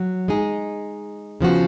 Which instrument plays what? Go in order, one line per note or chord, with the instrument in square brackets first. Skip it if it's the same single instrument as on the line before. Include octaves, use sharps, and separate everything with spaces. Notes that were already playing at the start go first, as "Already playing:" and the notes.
Already playing: [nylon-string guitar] F#3
G#3 D#4 G#4
C#3 F3 B3 F#4